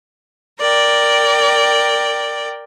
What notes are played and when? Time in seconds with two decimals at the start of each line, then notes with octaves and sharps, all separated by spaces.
0.59 A#4 D5 G5